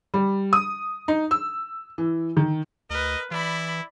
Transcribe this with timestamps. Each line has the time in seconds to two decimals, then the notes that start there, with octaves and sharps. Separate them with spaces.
0.14 G3
0.53 D#6
1.08 D#4
1.31 E6
1.98 E3
2.37 D#3
2.90 D2 A#4 B4 D#5
3.31 E3 E4 D5 B5